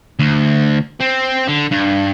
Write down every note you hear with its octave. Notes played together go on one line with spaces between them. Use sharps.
D2
C4
D3
G2